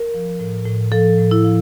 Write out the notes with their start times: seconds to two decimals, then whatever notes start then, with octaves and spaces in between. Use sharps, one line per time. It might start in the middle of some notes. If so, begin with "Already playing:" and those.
Already playing: A#4
0.14 F3
0.40 A2
0.66 A2
0.92 F3 A4
1.18 A2
1.31 E4
1.44 F3